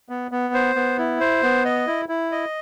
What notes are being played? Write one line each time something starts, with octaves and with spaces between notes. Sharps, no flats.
B3
B3
C5
B3
E4
C5
B3
D#5
E4
E4
D#5